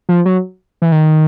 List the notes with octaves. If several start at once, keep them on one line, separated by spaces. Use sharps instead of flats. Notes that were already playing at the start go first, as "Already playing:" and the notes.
F3
F#3
E3
D#3